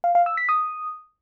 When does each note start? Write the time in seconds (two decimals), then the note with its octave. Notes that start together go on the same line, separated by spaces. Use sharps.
0.04 F5
0.15 F5
0.26 E6
0.37 B6
0.49 D#6